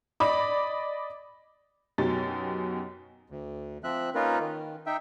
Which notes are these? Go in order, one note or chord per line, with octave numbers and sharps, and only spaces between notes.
D5 D#5 B5 D6
F#2 B2 D#4 G4 A6
D2
F3 C4 E5 F#6
A#3 C#4 D#4 F4 A#4 B4
D#3
D#4 E5 G5